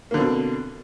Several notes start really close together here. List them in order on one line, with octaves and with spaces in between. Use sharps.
A#3 D3 C4 B2